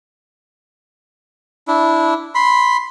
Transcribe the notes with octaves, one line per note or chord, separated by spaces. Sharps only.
D4 E4
B5 C6